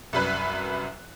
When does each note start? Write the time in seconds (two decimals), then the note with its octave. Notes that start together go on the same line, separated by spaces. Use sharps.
0.13 C2 F#2 B4 F#6